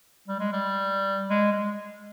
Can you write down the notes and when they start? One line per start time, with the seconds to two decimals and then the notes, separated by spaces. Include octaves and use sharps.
0.28 G3
0.40 G#3
0.53 G3
1.30 G#3
1.52 G#3